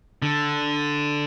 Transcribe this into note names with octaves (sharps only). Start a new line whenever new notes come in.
D3